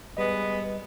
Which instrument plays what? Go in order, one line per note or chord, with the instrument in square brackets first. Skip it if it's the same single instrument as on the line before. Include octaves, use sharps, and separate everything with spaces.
[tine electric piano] G3 D#5 [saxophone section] G#3 B3